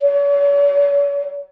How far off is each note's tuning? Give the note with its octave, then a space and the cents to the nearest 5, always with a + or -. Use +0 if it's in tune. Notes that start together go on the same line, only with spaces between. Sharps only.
C#5 +45